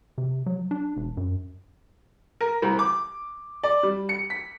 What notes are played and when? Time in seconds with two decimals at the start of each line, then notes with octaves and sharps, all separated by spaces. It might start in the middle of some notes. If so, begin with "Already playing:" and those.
0.18 C3
0.46 F#3
0.71 D4
0.97 E1
1.17 F#2
2.41 A#4
2.62 C2
2.79 D6
3.63 D5
3.83 G3
4.09 C#7
4.30 B6